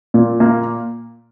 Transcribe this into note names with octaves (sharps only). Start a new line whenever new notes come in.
A#2
A#3